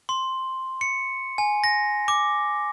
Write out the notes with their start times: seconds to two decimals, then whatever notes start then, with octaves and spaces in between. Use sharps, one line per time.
0.09 C6
0.81 C#7
1.38 G#5
1.64 A#6
2.08 D6